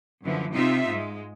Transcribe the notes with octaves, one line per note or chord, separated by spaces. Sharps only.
F#2 D3 E3 F3
C3 C4 D#4 F4 E5
G#2 G#3